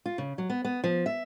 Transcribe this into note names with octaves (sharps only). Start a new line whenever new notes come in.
F4
C#3
F#3
B3
B3
F3
E5